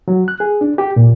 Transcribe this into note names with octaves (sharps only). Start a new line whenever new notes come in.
F#3
F#6
G#4
D4
G4
A#2